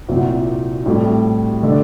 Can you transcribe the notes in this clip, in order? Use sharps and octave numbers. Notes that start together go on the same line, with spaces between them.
C2 A#2 F#3 C4 F#4
A2 G3 C4 G4
D3 A3 D4 A4